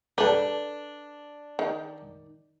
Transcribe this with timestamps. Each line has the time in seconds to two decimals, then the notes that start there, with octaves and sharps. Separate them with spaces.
0.18 D4 A4 B4
1.59 D#3